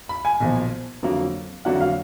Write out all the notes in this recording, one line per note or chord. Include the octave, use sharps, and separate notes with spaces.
B5
G#5
B1 A#2 F3
F2 D3 F#3 A#3
F2 D3 F#3 A#3 D4 F#5
F5